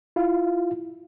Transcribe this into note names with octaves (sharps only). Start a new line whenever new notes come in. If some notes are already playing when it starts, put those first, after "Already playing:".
E4 F4 F5